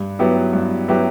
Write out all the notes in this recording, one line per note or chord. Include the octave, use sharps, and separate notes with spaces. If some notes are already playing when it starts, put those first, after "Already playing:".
Already playing: G2
F#3 B3 E4 G4
G2
F#3 B3 E4 G4